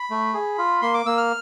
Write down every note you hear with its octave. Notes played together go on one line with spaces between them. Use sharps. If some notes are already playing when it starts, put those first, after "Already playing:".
Already playing: B5
A3
G#4
F4
A#3 C6
D6
A#3 E6
F6